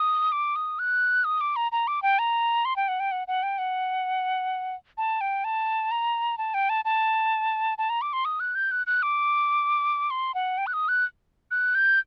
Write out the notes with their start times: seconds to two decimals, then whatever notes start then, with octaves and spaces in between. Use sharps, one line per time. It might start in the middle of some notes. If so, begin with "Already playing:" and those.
Already playing: D#6
0.32 D6
0.56 D#6
0.79 F#6
1.25 D#6
1.41 D6
1.56 A#5
1.72 A#5
1.88 D6
2.03 G5
2.19 A#5
2.65 C6
2.76 G5
2.88 F#5
3.00 G5
3.12 F#5
3.28 F#5
3.43 G5
3.58 F#5
4.98 A5
5.21 G5
5.44 A5
5.91 A#5
6.38 A5
6.54 G5
6.69 A5
6.85 A5
7.78 A5
7.90 A#5
8.02 D6
8.13 C6
8.25 D#6
8.40 F#6
8.55 G6
8.71 F#6
8.87 F#6
9.03 D6
10.10 C6
10.35 F#5
10.58 G5
10.67 F#6
10.73 D#6
10.88 F#6
11.51 F#6
11.75 G6